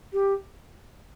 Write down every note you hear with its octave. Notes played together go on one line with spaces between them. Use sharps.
G4